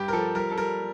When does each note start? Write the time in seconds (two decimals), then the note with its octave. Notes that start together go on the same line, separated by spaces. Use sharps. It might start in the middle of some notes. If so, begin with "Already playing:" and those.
Already playing: G2 G4
0.08 A#4
0.13 F3 A4
0.35 G3 A#4
0.51 A4
0.58 G3 A#4